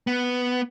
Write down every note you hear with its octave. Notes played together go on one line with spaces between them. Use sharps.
B3